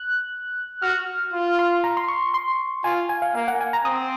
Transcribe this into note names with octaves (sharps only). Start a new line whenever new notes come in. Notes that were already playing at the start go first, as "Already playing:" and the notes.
Already playing: F#6
F#4 F6
F4
C6
A#5
C6
C#6
C6
F4 G#5
G#5
F5
A#3 F5
F#5
G#5
A#5
C4 D#6